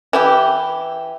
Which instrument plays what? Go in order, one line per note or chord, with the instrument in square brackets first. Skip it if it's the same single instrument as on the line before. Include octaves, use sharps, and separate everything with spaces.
[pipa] E3 E4 G4